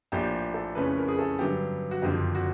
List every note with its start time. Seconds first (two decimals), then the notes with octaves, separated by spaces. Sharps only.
0.12 A#1 A2 F3 A3 G4
0.54 A4
0.75 F2 C#3 E3 A3 C#4 B4
0.97 A#4
1.08 G#4
1.19 A4
1.39 G2 D3 F#3 B3 G4
1.91 F#4
2.02 F#1 F2 D3 F3 G4
2.35 F#4